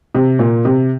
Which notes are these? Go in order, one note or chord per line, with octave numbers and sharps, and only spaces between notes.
C3
A#2
C3